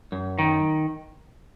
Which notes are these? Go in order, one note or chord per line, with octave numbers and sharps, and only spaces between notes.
F#2
D#3